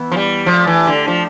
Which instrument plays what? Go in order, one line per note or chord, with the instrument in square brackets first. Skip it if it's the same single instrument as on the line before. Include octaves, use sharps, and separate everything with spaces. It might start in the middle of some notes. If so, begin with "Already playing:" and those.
Already playing: [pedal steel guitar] E3 B3 E4
[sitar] F3
G3
[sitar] F3 [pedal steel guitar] A3 D4 G4
[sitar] E3
D3
F3